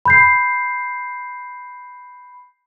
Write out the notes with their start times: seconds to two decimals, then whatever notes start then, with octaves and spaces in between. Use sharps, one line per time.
0.05 B5 G6 C7